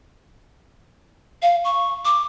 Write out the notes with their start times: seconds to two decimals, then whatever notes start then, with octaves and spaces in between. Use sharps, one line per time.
1.42 F5
1.64 C#6
2.05 D6